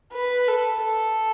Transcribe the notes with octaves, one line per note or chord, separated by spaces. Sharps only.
B4
A4
A4